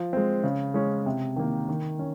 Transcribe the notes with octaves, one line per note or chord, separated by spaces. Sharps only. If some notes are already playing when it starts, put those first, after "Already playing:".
Already playing: F3
G#3 C4
C#3
G#3 C#4
C3
D#3 A#3
D#3
C#4